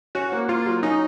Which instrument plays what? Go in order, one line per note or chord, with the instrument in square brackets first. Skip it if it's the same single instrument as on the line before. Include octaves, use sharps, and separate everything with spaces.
[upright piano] C#4 [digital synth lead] F#4
[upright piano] A#3
[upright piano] A#3 [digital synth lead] F4
[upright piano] F#3
[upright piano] C#4 [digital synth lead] D#4